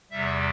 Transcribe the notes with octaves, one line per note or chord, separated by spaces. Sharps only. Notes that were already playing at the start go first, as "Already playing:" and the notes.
E2 C3 G3 E5